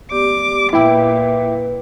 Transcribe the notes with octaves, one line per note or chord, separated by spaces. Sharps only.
B3 G4 D5 D6
A#2 E4 B4 E5 G5 D6